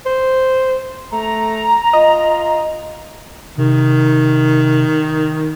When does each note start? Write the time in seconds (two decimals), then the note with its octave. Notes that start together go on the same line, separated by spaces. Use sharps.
0.06 C5
1.12 A3 A#5
1.93 F4 D#5
3.58 C3 D#3